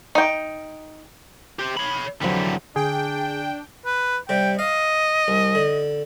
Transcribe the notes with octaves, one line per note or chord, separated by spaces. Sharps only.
D#4 G5
G4 C5
C#5 B5
F2 D3 E3 F#3 G3
D3 D4 G#4 G5
B4
C3 G3 G5
D#5 F5
C2
D3